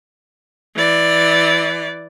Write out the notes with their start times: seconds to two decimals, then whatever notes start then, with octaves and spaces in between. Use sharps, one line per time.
0.76 E3 D5